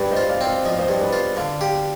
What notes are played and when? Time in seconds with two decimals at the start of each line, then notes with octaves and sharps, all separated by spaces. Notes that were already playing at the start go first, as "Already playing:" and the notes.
Already playing: G2 B4 D5
0.11 C5 D#5
0.17 F4
0.29 D5 F5
0.41 C4
0.47 D5 F5
0.65 F3 D#5
0.72 F5
0.79 C5 D#5
0.88 G2
1.01 B4 D5
1.13 F4
1.37 D3 F5
1.60 G4 F5